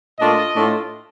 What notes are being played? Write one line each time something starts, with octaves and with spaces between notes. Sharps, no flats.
A#2 A3 D4 F4 D#5
A2 A3 D4 F4